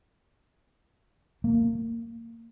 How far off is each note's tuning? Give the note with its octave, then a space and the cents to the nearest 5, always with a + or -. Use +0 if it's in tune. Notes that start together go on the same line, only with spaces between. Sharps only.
A#3 -20